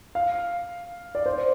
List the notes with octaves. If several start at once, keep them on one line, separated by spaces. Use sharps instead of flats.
F5
D5
C5